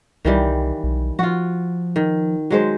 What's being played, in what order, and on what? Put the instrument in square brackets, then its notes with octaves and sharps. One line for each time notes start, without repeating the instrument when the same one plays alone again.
[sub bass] C2 [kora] D#3 E3 G3
[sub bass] B1
[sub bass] F3 [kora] F4 F#4
[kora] D#3
F#3 G#3 C5